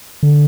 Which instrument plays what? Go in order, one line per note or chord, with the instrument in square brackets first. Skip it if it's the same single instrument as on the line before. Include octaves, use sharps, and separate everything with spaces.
[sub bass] D3